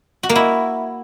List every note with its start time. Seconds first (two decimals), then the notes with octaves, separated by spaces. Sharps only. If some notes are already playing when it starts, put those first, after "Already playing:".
0.23 F#4
0.29 A#3
0.36 E4